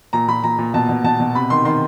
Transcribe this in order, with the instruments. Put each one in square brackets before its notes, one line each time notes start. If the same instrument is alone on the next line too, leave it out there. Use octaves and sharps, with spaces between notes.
[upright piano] A#2 A#5
A#2 B5
A#2 A#5
A#2
B2 A5
B2
B2 A5
B2
C3 B5
D#3 C6
D#3 C6